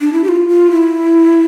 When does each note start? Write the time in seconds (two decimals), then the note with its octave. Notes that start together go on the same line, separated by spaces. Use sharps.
0.01 D4
0.13 E4
0.24 G4
0.29 F4
0.48 F4
0.71 E4